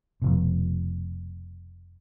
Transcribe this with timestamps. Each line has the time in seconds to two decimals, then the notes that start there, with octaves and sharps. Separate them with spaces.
0.22 F1 B2